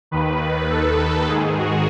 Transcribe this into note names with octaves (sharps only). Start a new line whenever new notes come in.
D#2 D#3 B4
A4
G#2 D#3 G#4
F#4